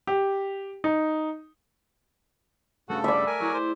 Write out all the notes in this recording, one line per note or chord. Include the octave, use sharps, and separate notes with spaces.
G4
D#4
G2 C#3 A3 F#4 A4
G3 D5 E5
A#4 G#5
F#3 E4 G#4
C5